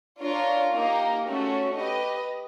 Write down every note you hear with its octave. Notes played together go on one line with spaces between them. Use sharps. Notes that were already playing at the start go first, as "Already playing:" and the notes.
D4 F4 A#4 C#5
A#3 D#4 G4 A#4
A3 C#4 F#4
G4 B4 D#5